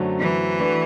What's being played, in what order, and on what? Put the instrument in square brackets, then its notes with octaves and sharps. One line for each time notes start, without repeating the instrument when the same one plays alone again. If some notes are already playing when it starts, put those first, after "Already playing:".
Already playing: [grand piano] F#2 D3 F#3 A3 C4
[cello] E3
[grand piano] A3 D4 F#4 B4